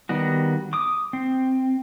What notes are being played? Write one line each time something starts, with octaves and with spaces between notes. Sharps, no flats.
D#3 G3 B3 F#4
D6 D#6
C4